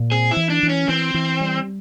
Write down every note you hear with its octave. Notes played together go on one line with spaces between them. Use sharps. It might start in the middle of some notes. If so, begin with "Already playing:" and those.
Already playing: A#2
C4 G#4
E4
E3
D4
E3
C#4
E3 C4
E3
G3